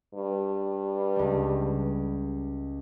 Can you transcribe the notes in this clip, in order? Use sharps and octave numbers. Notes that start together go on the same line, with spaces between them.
G2
C#2 G3